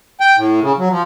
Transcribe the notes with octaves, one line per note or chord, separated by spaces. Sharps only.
G5
A2
C#3
F#3
F3